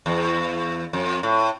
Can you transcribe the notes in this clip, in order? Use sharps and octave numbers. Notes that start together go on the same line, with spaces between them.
E2
F2
A2